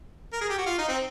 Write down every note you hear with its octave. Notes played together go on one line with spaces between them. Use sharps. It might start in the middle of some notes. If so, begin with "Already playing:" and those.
A#4
G#4
G4
F#4
F4
D#4
C4